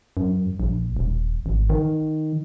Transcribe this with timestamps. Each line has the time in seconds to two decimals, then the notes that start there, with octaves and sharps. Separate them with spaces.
0.17 F#2
0.60 A#1
0.97 D#1
1.46 G#1
1.69 D#3